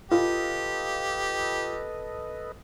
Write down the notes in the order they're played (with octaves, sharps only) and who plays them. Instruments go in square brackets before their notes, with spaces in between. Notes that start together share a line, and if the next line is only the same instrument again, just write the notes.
[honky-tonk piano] F4 [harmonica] G4 [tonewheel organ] A4 B4 D#5